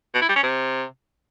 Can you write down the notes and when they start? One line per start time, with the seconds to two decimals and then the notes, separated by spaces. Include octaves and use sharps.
0.14 B2
0.21 E4
0.28 G3
0.36 C#4
0.43 C3